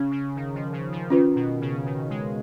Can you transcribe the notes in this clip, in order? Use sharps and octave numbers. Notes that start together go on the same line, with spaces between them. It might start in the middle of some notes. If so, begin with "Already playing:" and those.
Already playing: C#3 C#4
C#3
D#3
F3
C#3
F3
D#3 C#4 F4 B4
B2
C#3
D#3
G#3